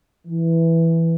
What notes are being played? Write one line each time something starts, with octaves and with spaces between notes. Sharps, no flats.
E3